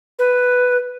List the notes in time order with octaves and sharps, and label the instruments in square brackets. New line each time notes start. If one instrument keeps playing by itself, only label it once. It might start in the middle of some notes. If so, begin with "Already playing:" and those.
[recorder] B4